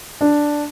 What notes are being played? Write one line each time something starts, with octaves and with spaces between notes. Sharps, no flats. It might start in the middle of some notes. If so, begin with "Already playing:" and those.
D4